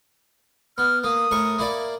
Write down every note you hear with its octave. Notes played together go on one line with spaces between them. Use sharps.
B3 F6
A#3 D#6
A2 A#4 C#6
A#3 E4 D5